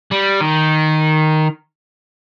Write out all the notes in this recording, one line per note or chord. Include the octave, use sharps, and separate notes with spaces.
G3
D#3